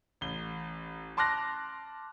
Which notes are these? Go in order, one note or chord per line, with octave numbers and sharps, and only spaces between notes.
A1 G7
A5 C6 D6 F6 F#6 A#6